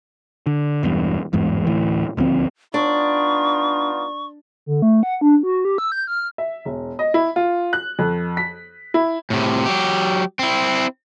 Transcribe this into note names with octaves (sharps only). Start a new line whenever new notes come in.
D3
E1 E2 G2
G1 E2 G#2
D1 A2 E3
D#1 D2 F3 C4
B3 D4 D#4 F4 C#6
D3
A3
F#5
D4
F#4
G4
E6
G6
F6
E5
E1
D#5
E4
F4
F#6
F2
B6
E4
A2 C3
F#3 G4
C4 E4